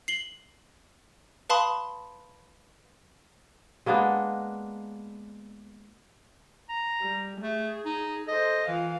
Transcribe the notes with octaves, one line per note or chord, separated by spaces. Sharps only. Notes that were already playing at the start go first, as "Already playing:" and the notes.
C7 F#7 G7
B4 F5 A5 B5 C6 D#6
G#3 A#3 B3 D4
A#5
G3
A3 G#4
D#4
A4 C5 D#5
E3 F4 F5